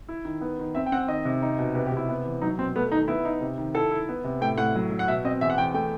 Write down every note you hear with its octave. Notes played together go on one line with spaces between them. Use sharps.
E4
D#3
B3
D#3
C4 E5
G5
C4 F#5
D#3 D#5
C3
D#4
B2
C3 B4
G4
C3 E4
B3
E3
F#3 D#4
B2 C4
A3 B3
D#3 D#4
B3 E4
D#4
C3
D#3
E4 A4
E4
B3
C3
A2 G5
A2 F#5
F#3
F#3
F#5
B2 E5
C4 D#5
E2 E5
F#5
E2 G5
A3 G5